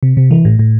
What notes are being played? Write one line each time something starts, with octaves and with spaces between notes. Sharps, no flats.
C3
C3
E3
A2
A2